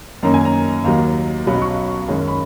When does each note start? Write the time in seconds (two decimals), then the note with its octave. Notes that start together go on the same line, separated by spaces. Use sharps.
0.23 F#2 D#3 A#3 C#4 A#5
0.34 G#5
0.45 A#5
0.84 D#2 D#3 F#3 A#5
1.46 B1 B2 F#3 C#4 B5
1.62 C#6
2.08 F#2 D#3 G#3 C#4
2.28 B5